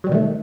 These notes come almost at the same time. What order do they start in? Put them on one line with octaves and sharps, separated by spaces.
F#3 G3 B2 D#3 A3